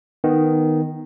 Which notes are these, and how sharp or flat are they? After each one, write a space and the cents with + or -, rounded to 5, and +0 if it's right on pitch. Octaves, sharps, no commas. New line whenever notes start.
D#3 +0 B3 +0